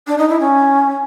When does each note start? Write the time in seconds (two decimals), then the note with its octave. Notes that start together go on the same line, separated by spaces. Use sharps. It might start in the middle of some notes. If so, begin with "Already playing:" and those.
0.07 D4
0.18 D#4
0.29 E4
0.40 C#4